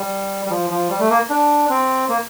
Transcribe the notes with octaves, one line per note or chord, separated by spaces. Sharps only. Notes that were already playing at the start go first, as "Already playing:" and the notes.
Already playing: G3
G3
F3
F3
G3
A3
A#3
D4
C4
A#3